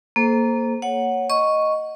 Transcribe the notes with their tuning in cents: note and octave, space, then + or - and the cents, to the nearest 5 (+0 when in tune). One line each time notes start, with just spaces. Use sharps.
A#3 +0 A4 -25 C5 +0
C#5 +0 F#5 +0
D#5 +0 C#6 +0